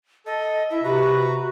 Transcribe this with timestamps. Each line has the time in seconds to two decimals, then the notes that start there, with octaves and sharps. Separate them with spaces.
0.26 A4 D#5
0.70 E4 E5
0.84 C3 F#4 B4 A#5